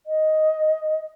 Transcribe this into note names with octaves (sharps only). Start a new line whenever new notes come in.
D#5